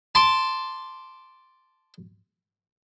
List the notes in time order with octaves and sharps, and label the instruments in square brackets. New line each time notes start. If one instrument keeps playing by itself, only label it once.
[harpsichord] A5 C6 D6